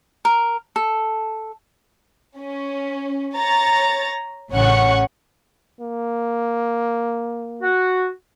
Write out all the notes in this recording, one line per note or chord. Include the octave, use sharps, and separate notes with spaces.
A#4
A4
C#4
C#5 A#5 A6
A1 C#3 C#4 C#5 F#5 C#6
A#3
F#4